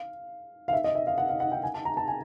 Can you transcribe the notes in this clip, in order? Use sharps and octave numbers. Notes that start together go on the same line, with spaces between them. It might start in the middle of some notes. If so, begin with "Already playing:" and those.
Already playing: F5
F5
E5
D#5
E5
F5
F#5
F5
F#5
G5
G#5
A5
A#5
A5
G#5